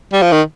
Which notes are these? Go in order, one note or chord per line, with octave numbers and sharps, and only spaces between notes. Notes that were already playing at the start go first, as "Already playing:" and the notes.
G3
F3
D#3